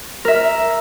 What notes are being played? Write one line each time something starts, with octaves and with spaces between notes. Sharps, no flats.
A#4 E5